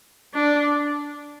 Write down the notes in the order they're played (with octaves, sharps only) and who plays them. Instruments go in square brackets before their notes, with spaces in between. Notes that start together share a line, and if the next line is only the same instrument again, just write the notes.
[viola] D4